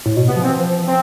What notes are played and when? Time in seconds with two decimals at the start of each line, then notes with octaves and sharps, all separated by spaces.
0.06 A2
0.17 B2
0.27 C3 B3
0.36 F3
0.42 E3 C4
0.57 F3
0.87 C4